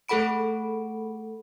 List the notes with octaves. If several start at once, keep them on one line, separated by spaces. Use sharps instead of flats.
A3 G#4 A4 F#5 B5 D7